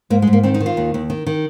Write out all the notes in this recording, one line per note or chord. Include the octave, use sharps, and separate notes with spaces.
G#2 A#3
G#3
G#2
A#3
D#3 C4
D#4
D#3
F4
D#2
D#2
D#3
D#3